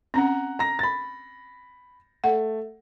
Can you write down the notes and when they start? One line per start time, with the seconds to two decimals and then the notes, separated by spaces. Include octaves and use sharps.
0.14 C4 C#4 F#5 A#5
0.59 A#5 A#6
0.79 B5 A6
2.24 A3 F#5